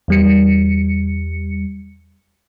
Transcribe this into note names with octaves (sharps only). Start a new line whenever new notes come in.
E2 G3 C#7